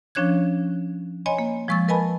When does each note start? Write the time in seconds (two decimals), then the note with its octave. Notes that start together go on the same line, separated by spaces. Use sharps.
0.15 F3 C#4 D4 C#5 F#6 G#6
1.26 C#5 D#5 G#5 B5 C6
1.39 A#3
1.68 F3 G#3 C#6 E6 A6
1.88 A#4 B4 D#5 G#5 A5 B5